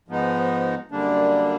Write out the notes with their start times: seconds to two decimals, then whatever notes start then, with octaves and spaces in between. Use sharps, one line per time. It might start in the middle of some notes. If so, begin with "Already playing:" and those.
0.08 G#2 F3 G#3 B3 D#4
0.91 F#2 D3 G3 A#3 D4